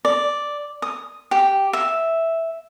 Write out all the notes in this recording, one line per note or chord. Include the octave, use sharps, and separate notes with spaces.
D5
D#6
G4
E5